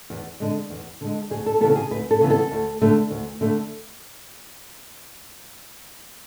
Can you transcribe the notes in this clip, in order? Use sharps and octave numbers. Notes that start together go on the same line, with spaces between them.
E2
D3 G#3
E2
D3 G#3
D2 G#4
A4
C#3 E3 B3 A4
G#4
D2 B4
A4
C#3 E3 B3
A4
D2
D3 A3
D2
D3 A3